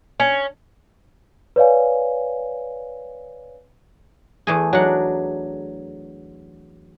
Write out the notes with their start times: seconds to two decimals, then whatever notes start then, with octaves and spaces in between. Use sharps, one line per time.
0.20 C#4
1.56 B4 C#5 D5 F5 G#5
4.47 E2 A3 G#4
4.73 F#3 D4 D#4 F#5